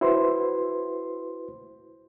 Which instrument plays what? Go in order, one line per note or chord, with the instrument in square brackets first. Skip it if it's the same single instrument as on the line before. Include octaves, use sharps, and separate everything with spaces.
[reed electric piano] E4 F#4 B4 C5 C6